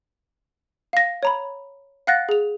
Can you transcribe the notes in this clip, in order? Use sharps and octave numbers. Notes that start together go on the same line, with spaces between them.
F5 A#6
C#5 A#5 B5
F5 F#5 F#6 A6 A#6
G#4 F7